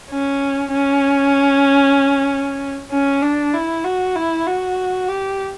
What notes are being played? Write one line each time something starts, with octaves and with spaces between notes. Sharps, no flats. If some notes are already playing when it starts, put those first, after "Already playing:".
C#4
C#4
C#4
D4
E4
F#4
E4
F#4
G4